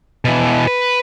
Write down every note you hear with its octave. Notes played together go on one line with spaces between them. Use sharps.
B2 E3
B4